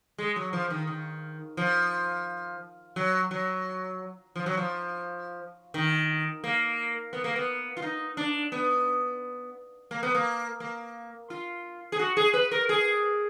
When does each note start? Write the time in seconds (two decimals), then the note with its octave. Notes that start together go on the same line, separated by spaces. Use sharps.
0.18 G#3
0.36 F#3
0.53 F3
0.70 D#3
0.87 D#3
1.57 F3
2.96 F#3
3.31 F#3
4.36 F3
4.46 F#3
4.57 F3
5.74 D#3
6.44 A#3
7.13 B3
7.24 A#3
7.36 B3
7.77 F4
7.82 D#4
8.17 D4
8.52 B3
9.91 A#3
10.03 B3
10.15 A#3
10.60 A#3
11.30 F4
11.92 G#4
11.99 F#4
12.17 G#4
12.34 B4
12.51 A#4
12.69 G#4